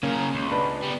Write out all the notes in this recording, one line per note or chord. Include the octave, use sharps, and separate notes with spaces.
C#3 A#3 C#4 A#4
C#2
D4 B4
G3 B3